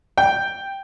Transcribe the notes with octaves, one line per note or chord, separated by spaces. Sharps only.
G5